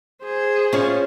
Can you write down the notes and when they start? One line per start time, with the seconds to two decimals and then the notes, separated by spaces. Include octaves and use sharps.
0.23 G#4 C5
0.73 C#4 F4 C#5